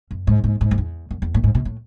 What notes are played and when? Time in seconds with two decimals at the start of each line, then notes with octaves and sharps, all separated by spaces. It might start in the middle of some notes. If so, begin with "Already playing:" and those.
0.11 F#2
0.27 G#2
0.44 G#2
0.61 G#2
0.71 F#2
0.78 E2
1.11 F#2
1.22 E2
1.34 A2
1.44 G#2
1.55 B2
1.65 A2